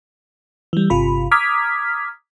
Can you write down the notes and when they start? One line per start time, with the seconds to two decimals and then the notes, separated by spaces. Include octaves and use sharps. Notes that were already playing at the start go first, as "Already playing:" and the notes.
0.73 E3 G3
0.90 G1 C3 F4 B5
1.31 A#5 D6 D#6 F6 G#6 B6